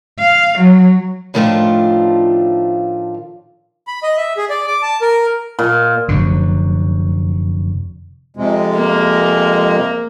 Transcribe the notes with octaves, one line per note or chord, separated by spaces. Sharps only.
F5
F#3
A2 D#3 F3 A3 D4 F4
B5
D#5
E5
G#4
D5
D6
A5
A#4
A#2
F1 F#2 D3
F2 C3 G#3
A#3